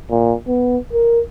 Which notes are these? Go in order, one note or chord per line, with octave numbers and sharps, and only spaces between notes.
A#2
B3
A#4